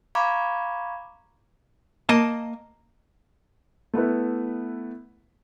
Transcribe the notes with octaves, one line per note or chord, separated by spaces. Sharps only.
F5 A#5 B5 C#6 D6 G#6
A#3 D#5 A5
A3 B3 E4 B4